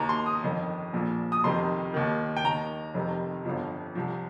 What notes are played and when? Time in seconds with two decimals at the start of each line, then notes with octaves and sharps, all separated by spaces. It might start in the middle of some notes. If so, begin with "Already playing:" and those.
Already playing: D#2 D#3 A#5
0.09 C6
0.26 D#6
0.43 G1 F2 D#3
0.93 A#1 A#2 F3
1.32 D#6
1.44 F1 F2 C3 D#3 C6
1.94 D#2 D#3
2.37 G5
2.44 D#2 D#3 A#5
2.94 F1 F2 C3 D#3
3.45 G1 F2 F3
3.95 C2 C3 F3